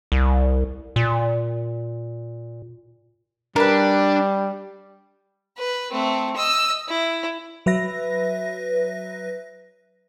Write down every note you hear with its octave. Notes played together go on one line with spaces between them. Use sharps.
C2
A#2
G3 D4 A#4 B4
B4
A3 C4
D#5 E6
E4
F#3 B4 E5 A#6